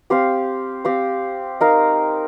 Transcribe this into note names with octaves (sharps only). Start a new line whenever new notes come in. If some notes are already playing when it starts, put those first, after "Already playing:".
C4 G4 C5 F5
C4 G4 C5 F5
D#4 A#4 F5